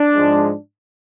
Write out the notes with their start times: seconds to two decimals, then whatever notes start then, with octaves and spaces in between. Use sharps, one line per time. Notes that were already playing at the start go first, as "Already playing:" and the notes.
Already playing: D4
0.13 G#2 F3 G#3